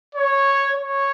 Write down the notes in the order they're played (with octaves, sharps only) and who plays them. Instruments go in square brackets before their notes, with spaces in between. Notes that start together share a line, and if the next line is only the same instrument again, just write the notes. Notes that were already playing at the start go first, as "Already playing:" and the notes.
[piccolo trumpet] C#5
C#5